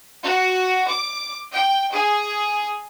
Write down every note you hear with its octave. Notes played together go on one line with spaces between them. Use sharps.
F#4
D6
G5
G#4